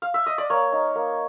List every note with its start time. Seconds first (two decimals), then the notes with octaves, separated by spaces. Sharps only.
0.02 F5
0.14 E5
0.26 D#5
0.38 D5
0.50 A#3 C#5
0.72 D#4
0.95 A#3